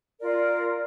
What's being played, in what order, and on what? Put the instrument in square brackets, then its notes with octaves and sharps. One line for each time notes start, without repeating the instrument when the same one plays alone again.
[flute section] F4 A#4 D5